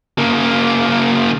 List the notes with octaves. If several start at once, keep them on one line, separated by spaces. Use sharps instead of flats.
C#3 A#3